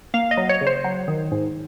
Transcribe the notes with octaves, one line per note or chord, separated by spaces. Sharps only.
A#3 F5
D#5
F#3
C#5
C#3
C5
F#3
D#3
G#2